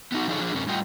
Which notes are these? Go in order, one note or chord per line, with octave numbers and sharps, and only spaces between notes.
B3 D#4 F#4
F3 D#4 F4 G#4 A4 C#5
F3 D4 G#4
F#2 C3 C#4
A2 G3 F4 D#5 F#5 G5